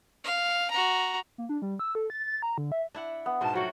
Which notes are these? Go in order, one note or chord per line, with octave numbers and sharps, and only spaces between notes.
F5
F#4 A#5
A#3
D4
G3
E6
A4
A6
A6
A#5
D3
E5
D4 E4 F#5
B3
G#2 B2 A#3 A5 C6
F3 F#3 A3 F#4 G5